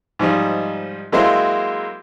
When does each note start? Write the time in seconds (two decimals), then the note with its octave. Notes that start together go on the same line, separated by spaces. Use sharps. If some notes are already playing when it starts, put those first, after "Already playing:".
0.19 G#2 F3 G3 D#4
1.12 F#3 G#3 A#3 C4 E4 C5